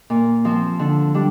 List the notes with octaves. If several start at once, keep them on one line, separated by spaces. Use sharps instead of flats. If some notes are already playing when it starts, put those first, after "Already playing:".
A#2
F3 C4
D3
G3 D4